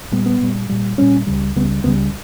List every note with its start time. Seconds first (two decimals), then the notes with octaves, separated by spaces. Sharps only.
0.12 A#2 G3 B3
0.26 B3
0.41 A#2 G3
0.69 A#2 G3
0.98 A#2 G3 C#4
1.27 C#2 C#3 G3
1.56 C#2 C#3 G3 B3
1.84 C#2 C#3 G3 B3